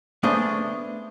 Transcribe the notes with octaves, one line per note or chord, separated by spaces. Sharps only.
A3 B3 D4 G#4 C5 F5